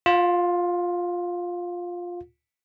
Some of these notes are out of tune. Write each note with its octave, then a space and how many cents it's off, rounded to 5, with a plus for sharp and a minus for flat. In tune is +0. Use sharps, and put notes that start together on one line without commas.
F4 +10 F#5 -40